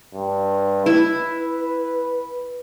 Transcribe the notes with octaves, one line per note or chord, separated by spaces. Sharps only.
G2
E4 B4